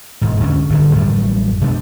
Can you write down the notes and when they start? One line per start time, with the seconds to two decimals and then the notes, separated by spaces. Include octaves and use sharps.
0.21 E1 G#2
0.40 C#2 D3 C4 C#4
0.69 G1 G#2 B2 D3
0.95 A1 F#2 A2 G3
1.61 B2 G#3 B3 D4